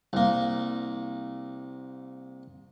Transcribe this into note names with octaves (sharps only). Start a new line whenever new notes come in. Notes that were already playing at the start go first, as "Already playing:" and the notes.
C2 A#3